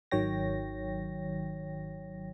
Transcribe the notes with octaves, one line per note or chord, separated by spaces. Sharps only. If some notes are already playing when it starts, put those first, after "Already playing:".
G#1 D#3 F#3 C#5 G5 A#6